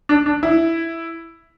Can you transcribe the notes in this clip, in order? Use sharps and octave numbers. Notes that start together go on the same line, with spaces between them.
D4
D4
E4